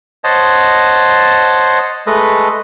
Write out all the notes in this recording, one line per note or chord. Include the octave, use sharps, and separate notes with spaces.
C5 C#5 D#5 F#5 A5
G#3 A3 A4 B4 D#5